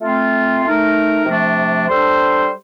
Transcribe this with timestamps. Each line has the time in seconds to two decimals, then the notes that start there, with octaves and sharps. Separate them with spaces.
0.01 A3 C4 F4
0.64 A3 D#4 A#4
1.26 C3 F3 A3 D4
1.88 G3 D4 A4 C5